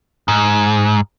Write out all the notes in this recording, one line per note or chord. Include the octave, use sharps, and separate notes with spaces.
G#2